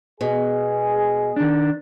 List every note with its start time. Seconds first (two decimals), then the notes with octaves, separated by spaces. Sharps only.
0.21 B2 G#4
1.36 D#3 D4